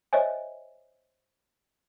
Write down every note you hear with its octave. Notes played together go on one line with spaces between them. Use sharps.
C5 C#5 D#5 E5 G#5